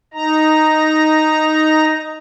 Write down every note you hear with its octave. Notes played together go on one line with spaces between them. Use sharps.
D#4 A#5